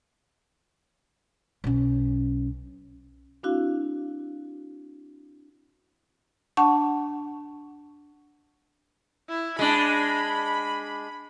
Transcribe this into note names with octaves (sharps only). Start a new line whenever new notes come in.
B1 C#4
C4 D4 E4 F#4 F5
D4 F#5 A5 C#6
E4
G#3 D4 B5